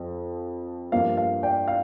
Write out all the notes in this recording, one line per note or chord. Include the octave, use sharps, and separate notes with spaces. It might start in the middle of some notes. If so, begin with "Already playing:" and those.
Already playing: F2 F3
G2 F3 A#3 F5
F5
D5 G5
F5